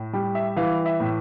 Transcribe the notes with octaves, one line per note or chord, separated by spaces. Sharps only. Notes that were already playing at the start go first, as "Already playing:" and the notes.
Already playing: A2
G3
E5
E3 F5
E5
A2